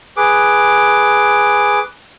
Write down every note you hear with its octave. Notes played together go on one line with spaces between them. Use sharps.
G#4 B4 D6